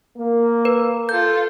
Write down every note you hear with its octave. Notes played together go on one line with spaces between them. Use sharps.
A#3
B4
F4 A4 G6